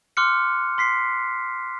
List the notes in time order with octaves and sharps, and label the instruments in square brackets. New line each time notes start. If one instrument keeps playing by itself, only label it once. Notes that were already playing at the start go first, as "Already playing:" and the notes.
[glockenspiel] C6 D6 F6 F#6 C#7
C6 B6 C7